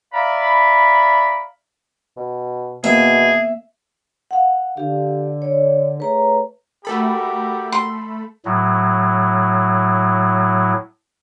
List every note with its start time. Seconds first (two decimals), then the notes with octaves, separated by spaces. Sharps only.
0.14 D5 E5 F5 A#5 B5
2.17 B2
2.84 B2 A#3 B3 G#4 E5
4.31 F5 F#5
4.77 D3 G4 F5
5.42 C#5 D5
6.00 A3 G#4 B4 C#5 A#5
6.85 A3 F#4 G4 A4 A#4 B5
7.72 C6
8.45 A2 F#3